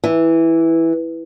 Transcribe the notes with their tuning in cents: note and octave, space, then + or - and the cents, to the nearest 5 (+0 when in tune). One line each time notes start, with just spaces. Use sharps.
E3 -5